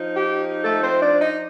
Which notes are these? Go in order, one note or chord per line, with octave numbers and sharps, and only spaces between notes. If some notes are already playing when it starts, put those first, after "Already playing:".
Already playing: F3 D#4
G4
A3 A4
C4 C5
D4 D5
D#4 D#5